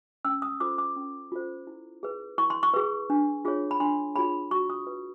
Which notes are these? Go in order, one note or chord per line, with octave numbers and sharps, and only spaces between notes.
C#4 E6
D#6
F4 A4 C5 D6
D6
C#4
F4 A4 C5
E4
G#4 B4
E4 C#6
C6
C#6
G#4 B4
D4
F4 G#4 C#5
B5
D4 C6
F4 G#4 C#5 B5
F#4 C#6
D#6
B4